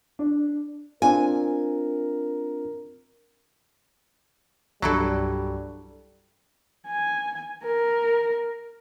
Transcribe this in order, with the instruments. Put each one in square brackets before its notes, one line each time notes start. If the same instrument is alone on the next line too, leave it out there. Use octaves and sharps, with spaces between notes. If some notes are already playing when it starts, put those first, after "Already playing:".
[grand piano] D4
[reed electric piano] C4 D4 F4 [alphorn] A#4 [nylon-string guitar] G#5
[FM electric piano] C2 G2 [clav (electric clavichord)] F#3 [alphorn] G3 [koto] D4 E4 A4
[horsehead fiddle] G#5
A#4